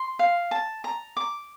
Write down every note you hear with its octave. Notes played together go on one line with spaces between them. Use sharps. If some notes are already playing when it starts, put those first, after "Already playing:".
Already playing: C6
F5
A5
A#5
D6